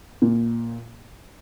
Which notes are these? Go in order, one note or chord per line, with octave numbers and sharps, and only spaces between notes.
A#2